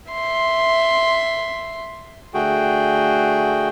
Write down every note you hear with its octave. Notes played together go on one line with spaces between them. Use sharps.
E5 C6
D3 A3 F#4 G#4 G5